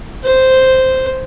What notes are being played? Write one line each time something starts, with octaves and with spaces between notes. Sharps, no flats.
C5